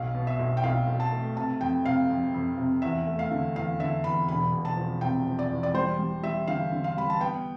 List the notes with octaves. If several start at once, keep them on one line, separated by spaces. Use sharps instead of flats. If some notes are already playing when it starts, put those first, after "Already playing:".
Already playing: B1 F5
B2
E5
B1
G5
B1 F5
B1
A5
A3
C3 A5
F2 G5
C3 F5
F2
F2
C3
E2 E5
A3
F5
D3
E2 F5
D3 E5
E2 B5
E1 B5
E1
A5
F3
C3 G5
F3
D5
E2
D5
G3 C5
G3
G3 E5
D3 F5
D3
F5
G3 B5
A5
B3 G5